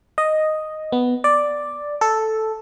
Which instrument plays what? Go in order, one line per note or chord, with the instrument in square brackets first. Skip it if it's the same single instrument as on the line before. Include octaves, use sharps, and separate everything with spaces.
[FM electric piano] D#5
B3
D5
A4